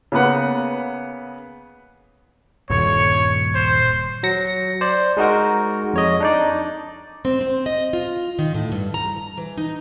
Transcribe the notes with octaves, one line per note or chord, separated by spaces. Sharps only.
C#3 A#3 B3 B4 F#5
D#1 G2 C#5
C5
F#3 A#6 C#7
C5 D5
G#3 D#4 F#4 A#4
F2 C#5 D#5
D4 D#4 D5
C4
C4
D#5
F4
D#3
A2
G2
A#5
E3
D#4